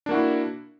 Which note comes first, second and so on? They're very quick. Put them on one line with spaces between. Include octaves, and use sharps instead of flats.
D4 A#3 F#4 E4